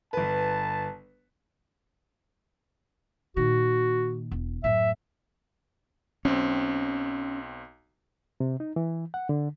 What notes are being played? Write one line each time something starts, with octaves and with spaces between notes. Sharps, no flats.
G1 B4 A5
A#2 D#3 F#4
E1
F#2 A2 E5
B1 C4 C#4
C3
D#4
E3
F#5
D3